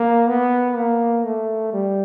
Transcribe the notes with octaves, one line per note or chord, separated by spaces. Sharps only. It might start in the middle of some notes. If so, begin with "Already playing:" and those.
Already playing: A#3
B3
A#3
A3
G3